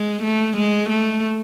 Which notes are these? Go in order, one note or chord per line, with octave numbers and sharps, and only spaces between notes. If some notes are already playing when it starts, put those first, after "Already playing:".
Already playing: G#3
A3
G#3
A3